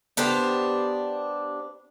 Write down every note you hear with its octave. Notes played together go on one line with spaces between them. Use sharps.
B3 D4 G4 C5